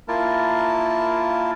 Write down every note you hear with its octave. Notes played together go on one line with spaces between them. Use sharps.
A#3 E4 F4 A#4 A5